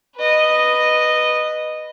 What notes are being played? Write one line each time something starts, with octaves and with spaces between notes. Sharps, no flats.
B4 D#5